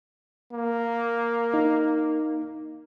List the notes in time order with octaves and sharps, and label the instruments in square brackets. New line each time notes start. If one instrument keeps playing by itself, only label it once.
[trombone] A#3
[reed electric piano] D#4